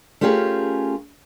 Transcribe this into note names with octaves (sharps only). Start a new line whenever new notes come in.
A3 C#4 F4 G4 G#4 A#4